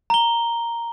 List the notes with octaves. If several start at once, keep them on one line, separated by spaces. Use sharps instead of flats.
A#5 G7